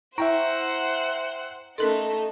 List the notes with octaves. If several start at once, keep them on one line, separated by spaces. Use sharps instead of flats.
E4 C5 E5 F#5 G5 A#5
A3 C#4 D#4 A4 A#4 C6